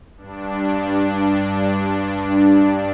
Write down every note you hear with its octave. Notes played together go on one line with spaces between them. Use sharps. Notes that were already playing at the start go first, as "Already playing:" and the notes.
G2 D4